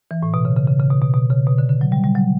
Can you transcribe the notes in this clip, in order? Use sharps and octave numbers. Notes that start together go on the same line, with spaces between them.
E3
A2
B2
C#3
C#3
C#3
C#3
B2
B2
B2
C#3
B2
D3
D3
F#3
G3
G3
F#3